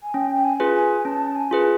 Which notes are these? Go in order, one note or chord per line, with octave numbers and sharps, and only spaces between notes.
G#5
C#4 G5
G5
G#5
F4 G#4 B4
G#5
C#4 A5
G#5
F4 G#4 B4